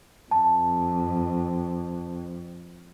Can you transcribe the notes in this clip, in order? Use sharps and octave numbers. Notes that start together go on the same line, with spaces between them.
F2 A5